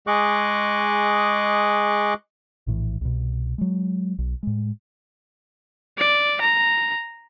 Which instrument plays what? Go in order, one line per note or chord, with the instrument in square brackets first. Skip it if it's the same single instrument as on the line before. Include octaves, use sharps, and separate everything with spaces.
[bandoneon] G#3 G#4 D#5 C#6 D6 F#6
[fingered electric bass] A#1 A2 E3
C2 B2
F#3 G#3
B1
A2 G#3
[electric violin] D5
A#5